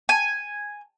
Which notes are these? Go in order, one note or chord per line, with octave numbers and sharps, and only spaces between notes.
G#5